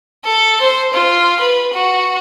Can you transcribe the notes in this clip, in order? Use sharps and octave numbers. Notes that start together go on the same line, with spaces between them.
A4
C5
F4
B4
F#4